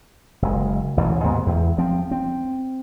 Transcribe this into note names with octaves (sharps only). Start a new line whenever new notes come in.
F#1 G#3
A1 D2 B2 E3
D#2 G#2 A#3 B3
E2
F3 C4
C4